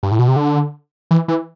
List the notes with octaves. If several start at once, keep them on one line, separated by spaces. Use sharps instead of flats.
G2
A2
B2
C3
D3
E3
E3